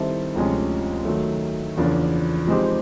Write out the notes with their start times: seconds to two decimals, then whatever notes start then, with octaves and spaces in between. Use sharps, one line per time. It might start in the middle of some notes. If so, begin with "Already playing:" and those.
Already playing: D#3 G3 C4 E4 A4
0.34 D2 C3 F3 G#3 C#4
1.05 D#3 F#3 A3
1.77 E2 C#3 F3 A#3 D4
2.47 F3 G#3 C4 D#4 G4